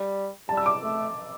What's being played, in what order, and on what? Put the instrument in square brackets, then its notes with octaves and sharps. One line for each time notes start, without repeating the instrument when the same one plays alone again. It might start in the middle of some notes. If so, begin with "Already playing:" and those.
Already playing: [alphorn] G3
[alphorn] G3 [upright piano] A5
[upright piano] E6
D6
[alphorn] A3